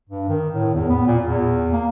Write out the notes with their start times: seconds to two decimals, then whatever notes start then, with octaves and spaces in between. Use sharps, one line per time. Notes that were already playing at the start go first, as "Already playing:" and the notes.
0.09 G2
0.29 D#3
0.54 A2
0.74 E2
0.90 B3
1.07 A#2
1.24 E2
1.73 A#3